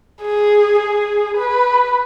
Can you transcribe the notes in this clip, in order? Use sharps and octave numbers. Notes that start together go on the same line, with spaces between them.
G#4
G#4
B4